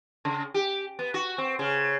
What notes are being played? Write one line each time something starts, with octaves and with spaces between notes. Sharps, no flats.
C#3
G4
B3
F#4
C4
C#3